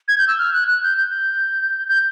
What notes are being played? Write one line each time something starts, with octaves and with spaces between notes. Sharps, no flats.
G#6
G6
E6
F6
F#6
F#6
G6
G6
G6